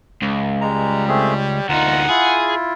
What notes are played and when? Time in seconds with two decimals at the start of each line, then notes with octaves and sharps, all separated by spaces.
0.22 C#2
0.61 G3 G#3 A#5
1.08 A3 C4 G#4
1.39 C#5
1.69 D2 D#4 F4 F#5 A#5
2.08 E4 F4 G#4